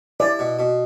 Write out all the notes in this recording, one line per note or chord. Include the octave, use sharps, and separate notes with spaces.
E4 D5
B2
B2